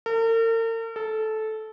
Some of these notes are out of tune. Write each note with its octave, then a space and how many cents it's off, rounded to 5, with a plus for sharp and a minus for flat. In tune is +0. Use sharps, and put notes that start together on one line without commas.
A#4 -45
A4 -15